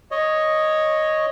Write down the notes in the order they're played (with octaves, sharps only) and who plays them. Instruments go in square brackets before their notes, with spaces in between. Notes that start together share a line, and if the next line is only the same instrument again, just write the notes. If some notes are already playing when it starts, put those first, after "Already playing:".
[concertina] C#5 D#5